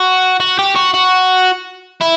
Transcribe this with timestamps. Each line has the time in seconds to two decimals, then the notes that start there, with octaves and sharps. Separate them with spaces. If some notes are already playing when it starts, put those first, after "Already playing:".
Already playing: F#4
0.40 F#4
0.59 G4
0.76 F#4
0.94 F#4
2.01 E4